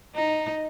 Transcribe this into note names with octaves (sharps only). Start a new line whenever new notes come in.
D#4